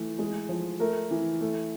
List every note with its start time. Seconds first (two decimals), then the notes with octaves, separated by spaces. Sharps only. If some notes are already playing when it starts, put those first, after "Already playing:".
Already playing: E3 A3
0.19 G#3
0.49 F3
0.80 A3 A#4
1.11 E3
1.41 A3